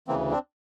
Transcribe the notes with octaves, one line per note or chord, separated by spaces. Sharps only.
D2 C#3 E3 A#3 C4
C4 D4